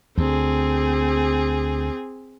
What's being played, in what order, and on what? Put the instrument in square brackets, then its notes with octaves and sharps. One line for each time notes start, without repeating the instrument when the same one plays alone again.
[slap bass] D2 [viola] C4 G#4